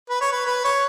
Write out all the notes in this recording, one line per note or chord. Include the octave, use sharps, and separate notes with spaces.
B4
C#5
B4
B4
C#5